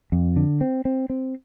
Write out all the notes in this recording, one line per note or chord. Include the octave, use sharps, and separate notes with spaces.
F2
D3
C4
C4
C4